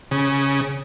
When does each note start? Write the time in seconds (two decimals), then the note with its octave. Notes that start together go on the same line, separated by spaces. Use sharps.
0.11 C#3